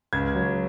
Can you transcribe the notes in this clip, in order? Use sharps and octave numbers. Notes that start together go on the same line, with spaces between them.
C#2 G#6
F#3